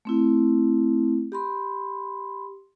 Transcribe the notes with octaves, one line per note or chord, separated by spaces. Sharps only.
A3 C4 E4
G4 B5 C6